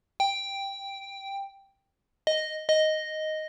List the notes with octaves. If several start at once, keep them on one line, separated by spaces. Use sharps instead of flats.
G5
D#5
D#5